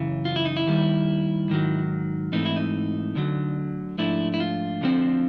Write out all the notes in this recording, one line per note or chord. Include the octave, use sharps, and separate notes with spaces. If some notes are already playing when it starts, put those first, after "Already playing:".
Already playing: F#2 C#3 E3
F4
E4
D#4
E4
D#2 D#3 G3
G#2 D#3 F#3
G#2 E3 A3 C4 D#4
E4
D#4
D2 D3 F#3
G#2 F3 A3 D4 E4
E4
F4
D2 D3 F3 G#3 C4